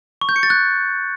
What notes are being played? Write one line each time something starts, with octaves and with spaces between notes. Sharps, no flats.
C#6
G6
C#7
A6
F#6